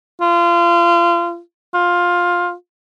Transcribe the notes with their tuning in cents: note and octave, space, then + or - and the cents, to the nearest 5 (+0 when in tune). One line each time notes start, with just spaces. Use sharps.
F4 -30
F4 +10